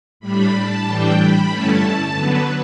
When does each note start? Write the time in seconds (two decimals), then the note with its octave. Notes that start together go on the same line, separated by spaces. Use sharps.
0.20 A2 G3 D4 B5
0.53 A5
0.84 A2 E3 G3 D4 G5
1.16 B5
1.49 G2 D3 A3 C#4 E4 A5
2.14 D3 F#3 B3 B4